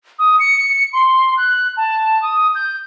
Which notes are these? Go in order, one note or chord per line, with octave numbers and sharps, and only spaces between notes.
D#6
C#7
C6
F#6
A5
D#6
G6